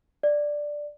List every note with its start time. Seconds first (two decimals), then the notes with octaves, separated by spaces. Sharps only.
0.23 D5